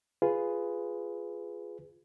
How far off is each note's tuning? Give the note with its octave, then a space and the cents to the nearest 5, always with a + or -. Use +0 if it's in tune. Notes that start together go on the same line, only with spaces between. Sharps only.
F4 +0 G#4 +0 B4 +10